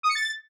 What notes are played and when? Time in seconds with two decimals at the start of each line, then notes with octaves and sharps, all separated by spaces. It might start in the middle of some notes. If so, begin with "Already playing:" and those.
0.03 D#6
0.09 C#7
0.15 A6